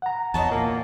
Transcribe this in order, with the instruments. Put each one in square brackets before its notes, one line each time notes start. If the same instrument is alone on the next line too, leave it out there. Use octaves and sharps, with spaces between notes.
[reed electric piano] F#5 A#5
[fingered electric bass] E2 [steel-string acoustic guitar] E3 C#5 D#5 [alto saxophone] A5
[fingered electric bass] A#2 [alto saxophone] A#3